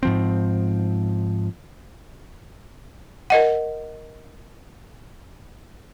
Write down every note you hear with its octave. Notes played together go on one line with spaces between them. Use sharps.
G#2 F3 C4
A#4 D#5 F#5